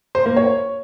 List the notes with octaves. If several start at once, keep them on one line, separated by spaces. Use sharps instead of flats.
C5
A#3
C#5